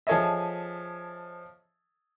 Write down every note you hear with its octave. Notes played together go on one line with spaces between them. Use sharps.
F3 G#4 A4 C#5 D#5 E5